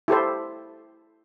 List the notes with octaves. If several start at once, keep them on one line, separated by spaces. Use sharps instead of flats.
E4 G4 A4 C5